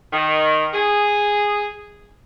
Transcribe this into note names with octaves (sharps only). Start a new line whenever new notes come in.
D#3
G#4